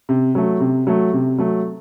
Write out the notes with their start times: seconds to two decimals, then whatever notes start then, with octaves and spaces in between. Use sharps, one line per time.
0.09 C3
0.35 F#3 A3
0.60 C3
0.87 F#3 A3
1.13 C3
1.38 F#3 A3